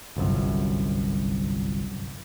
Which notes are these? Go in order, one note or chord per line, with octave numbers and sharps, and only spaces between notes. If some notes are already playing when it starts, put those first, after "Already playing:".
G1 C2 F#2